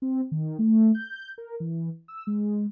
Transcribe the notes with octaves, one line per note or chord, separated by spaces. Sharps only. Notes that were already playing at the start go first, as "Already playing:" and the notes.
C4
D#3
A3
G6
A#4
E3
E6
G#3